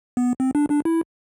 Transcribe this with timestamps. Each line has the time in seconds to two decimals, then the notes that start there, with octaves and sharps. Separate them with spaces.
0.17 B3
0.40 C4
0.55 D4
0.70 D4
0.85 E4